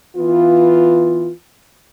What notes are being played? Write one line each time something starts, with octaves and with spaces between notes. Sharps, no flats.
E3 B3 F4